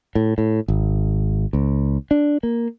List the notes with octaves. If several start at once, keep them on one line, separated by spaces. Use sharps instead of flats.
A2
A2
G#1
C#2
D4
A#3